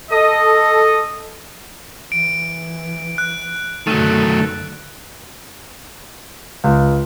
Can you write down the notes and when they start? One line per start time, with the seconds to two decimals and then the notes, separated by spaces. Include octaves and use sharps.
0.10 A4 D#5
2.12 E3 D7
3.18 F#6
3.87 F#2 D3 D#3 F#3 A3
6.64 C#2